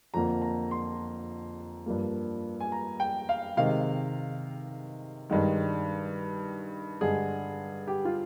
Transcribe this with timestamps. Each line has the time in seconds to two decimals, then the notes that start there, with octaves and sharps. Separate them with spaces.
0.14 F2 D3 F3 A#3 A#5
0.42 A#5
0.71 C6
1.86 G2 F3 A#3
2.60 G#5
2.72 A#5
3.00 G5
3.29 F5
3.57 C3 D#3 G#3 F5
5.30 G2 D#3 G#3
7.01 G2 D3 G#3 G#4
7.88 G4
8.05 F4